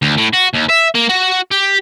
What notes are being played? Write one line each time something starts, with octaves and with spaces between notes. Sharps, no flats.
D2
A2
F#4
D#2
E5
A#3
F#4
G4